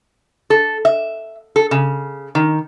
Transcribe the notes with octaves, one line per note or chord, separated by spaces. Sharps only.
A4
E5
A4
C#3
D#3